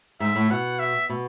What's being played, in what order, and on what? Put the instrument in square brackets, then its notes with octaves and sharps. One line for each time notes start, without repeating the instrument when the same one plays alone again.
[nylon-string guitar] G#2 [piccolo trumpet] E5
[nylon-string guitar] A2
[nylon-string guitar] B2 [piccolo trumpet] F#5
[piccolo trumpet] E5
[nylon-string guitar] B2